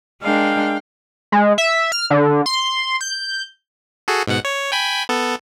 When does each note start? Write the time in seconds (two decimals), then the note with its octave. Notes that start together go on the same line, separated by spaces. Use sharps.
0.22 G#3 D4 A#4 F5 G5
1.32 G#3
1.58 E5
1.92 F6
2.11 D3
2.46 C6
3.01 G6
4.08 F#4 G#4 A4
4.27 G#2 B2 F#5
4.45 C#5
4.72 G5 G#5 B5
5.09 B3 A4